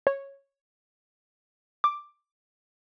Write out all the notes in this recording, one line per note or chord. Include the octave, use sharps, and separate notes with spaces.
C#5
D6